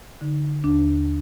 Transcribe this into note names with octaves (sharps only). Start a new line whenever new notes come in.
D3 D#4
D#2 D4